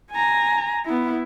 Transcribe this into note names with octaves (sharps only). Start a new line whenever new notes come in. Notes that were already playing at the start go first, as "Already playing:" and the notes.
G#5 A#5
B3 E4